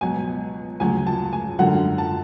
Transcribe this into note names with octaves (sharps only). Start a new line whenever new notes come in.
C#2 B2 F#3 G#5
D2 C#3 F#3 G#5
A5
G#5
F#2 D3 F#3 F#5
A5